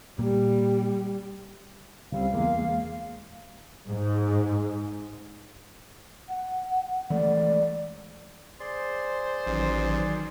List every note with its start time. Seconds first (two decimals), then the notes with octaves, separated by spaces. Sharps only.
0.19 A#2 G3 A#3
2.12 C#2 G3 C4 F5
2.34 E2 G#3 A#3
3.89 G#2
6.29 F#5
7.10 E3 G#3 A3 D5
8.60 G#4 C5 D5 C6
9.47 A1 D#3 F#3